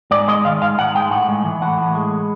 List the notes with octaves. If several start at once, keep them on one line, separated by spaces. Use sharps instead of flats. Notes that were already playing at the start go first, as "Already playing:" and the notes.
G#2 D5
G#3 D#5
D#3 F5
G#2 F5
G#2 F#5
G#3 G5
A2 F#5
G#3
E3
A2 F#5
A2
G#3